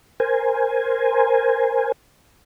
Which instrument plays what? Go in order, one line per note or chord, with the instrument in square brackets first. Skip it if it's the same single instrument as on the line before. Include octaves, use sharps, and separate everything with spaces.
[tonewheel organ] A#4 C5 G#5